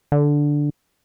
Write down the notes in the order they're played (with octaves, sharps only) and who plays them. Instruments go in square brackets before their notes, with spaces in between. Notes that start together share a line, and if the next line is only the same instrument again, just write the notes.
[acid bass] D3